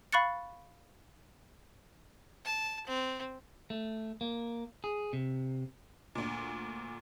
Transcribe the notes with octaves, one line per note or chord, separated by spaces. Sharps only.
F5 B5 C#6 F#6 A6 C#7
A5
C4
A3
A#3
G#4
C3
D2 A#2